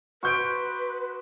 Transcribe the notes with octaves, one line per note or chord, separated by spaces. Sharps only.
F#4 B4 C5 D#5 C#6 G6 D7